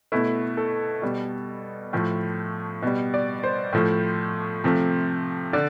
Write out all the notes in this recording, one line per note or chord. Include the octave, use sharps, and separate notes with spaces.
B2 A3 E4
A4
B2 G3
A2 F3 A3
B2 G3
D5
C5
A2 F3 A3
C3 F3 A3
D3 D5